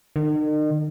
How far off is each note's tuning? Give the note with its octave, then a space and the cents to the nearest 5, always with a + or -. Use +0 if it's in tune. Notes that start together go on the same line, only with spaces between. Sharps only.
D#3 -40